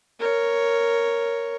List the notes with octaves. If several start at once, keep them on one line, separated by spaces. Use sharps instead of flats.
A#4 C#5